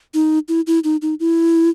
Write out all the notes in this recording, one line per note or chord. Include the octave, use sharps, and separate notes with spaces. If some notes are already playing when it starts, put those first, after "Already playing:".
D#4
E4
E4
D#4
D#4
E4